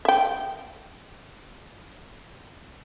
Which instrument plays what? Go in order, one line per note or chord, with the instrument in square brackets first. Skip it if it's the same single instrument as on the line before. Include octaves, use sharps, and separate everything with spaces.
[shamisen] E5 G5